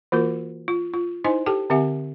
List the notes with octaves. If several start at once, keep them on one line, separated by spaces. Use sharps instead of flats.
E3 A#3 F4 F#4 A#4
F4
F4
D#4 E4 C5 D#5 G#5
G4 A4 G5 A5
D3 C4 G4 E5 F#5 G#5